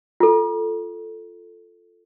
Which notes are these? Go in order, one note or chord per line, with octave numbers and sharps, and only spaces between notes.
F4 A4